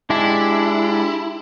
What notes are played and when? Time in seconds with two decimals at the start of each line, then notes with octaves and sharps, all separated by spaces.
0.10 G#3 D4 E4 G4